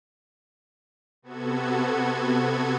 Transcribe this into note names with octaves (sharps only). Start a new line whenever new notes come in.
C3 B3 F#4 A4 G#6